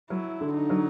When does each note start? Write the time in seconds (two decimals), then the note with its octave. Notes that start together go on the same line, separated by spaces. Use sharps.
0.10 F#3 E4
0.41 D3
0.56 D#4
0.70 F#3